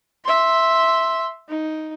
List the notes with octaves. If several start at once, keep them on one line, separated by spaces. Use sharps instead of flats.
E5 C6
D#4